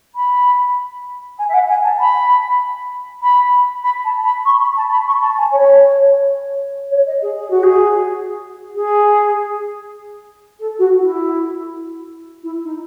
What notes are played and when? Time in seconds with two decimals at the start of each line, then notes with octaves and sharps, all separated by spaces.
0.15 B5
1.38 G#5
1.48 E5
1.53 F#5
1.68 G#5
1.84 A5
1.99 B5
3.22 B5
3.83 B5
4.04 A5
4.24 B5
4.45 C#6
4.60 B5
4.76 A5
4.90 B5
5.07 C#6
5.21 A5
5.37 G#5
5.52 C#5
6.91 C#5
7.06 D#5
7.22 G#4
7.37 G#4
7.50 F#4
7.63 G#4
8.75 G#4
10.59 A4
10.78 F#4
11.00 E4
12.43 E4
12.64 D#4